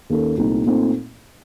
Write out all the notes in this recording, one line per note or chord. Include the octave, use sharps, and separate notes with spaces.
D#2 D#3 A#3 C#4 A4
C2 A#2 A3 C4 D#4
A#2 A3 C4 D#4